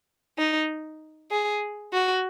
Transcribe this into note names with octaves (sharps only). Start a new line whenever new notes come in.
D#4
G#4
F#4